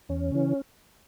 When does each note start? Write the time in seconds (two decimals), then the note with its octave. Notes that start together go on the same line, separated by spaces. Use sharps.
0.09 E2 C#4
0.32 C#3 E3